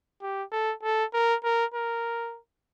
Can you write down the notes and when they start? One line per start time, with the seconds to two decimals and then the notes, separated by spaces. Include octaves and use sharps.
0.22 G4
0.52 A4
0.83 A4
1.13 A#4
1.44 A#4
1.74 A#4